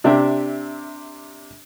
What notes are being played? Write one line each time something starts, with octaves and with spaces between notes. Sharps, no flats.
C3 D4 G4 E5